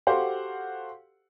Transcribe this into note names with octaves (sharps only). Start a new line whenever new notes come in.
F#4 G4 A4 C5 F5 F#5